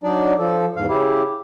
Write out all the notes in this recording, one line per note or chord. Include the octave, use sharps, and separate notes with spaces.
F#3 D4 D#4 D5
F3 A4
E2 G#2 F5
C#3 E4 G4